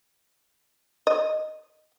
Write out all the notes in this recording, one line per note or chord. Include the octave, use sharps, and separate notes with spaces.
D#5